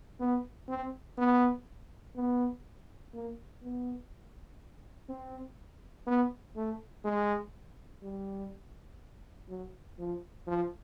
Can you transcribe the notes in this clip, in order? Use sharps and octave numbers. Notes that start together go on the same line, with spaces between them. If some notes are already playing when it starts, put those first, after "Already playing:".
B3
C4
B3
B3
A#3
B3
C4
B3
A3
G#3
G3
F#3
F3
F3